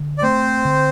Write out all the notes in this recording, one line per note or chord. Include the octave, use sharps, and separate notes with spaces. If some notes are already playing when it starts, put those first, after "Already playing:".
Already playing: D3
D5
A3 C4 C5
D3